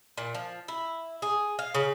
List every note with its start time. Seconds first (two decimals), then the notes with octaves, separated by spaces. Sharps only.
0.18 A#2
0.34 F3
0.68 E4
1.22 G#4
1.59 F5
1.75 C#3